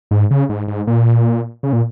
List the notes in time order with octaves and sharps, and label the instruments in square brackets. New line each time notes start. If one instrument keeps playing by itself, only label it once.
[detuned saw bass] G#2
C#3
G#2
G#2
A#2
C#3
A#2